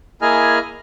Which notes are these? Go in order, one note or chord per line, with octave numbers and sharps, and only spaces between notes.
A#3 E4 G#4 D#5 G#5 F6